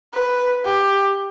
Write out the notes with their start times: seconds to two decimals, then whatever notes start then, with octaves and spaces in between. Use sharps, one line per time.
0.14 B4
0.65 G4